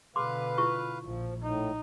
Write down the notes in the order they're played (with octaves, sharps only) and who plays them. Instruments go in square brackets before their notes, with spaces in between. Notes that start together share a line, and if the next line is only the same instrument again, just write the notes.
[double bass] B2 D3 [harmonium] B4 F5 [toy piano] C6 D6
[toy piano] E4 F4 C#6
[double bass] A#1 [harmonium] F3
[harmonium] A2 [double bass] D#4